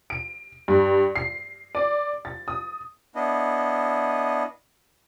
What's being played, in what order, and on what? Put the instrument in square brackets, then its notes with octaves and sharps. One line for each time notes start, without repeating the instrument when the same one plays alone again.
[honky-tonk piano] D7
G2
C7
D5
A6
D#6
[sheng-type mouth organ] B3 D4 E4 D#5